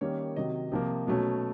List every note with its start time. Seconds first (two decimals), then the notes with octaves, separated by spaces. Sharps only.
0.01 D#3 G3 A#3 C#4 C#5
0.36 C3 D#3 F#3 D#5
0.72 C3 F3 A#3
1.07 B2 F#3 A3 C#4